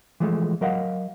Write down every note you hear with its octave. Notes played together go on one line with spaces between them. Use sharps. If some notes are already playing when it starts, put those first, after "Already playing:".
E3 F3 G#3 A3
F#3 A#4 D#5 F5 F#5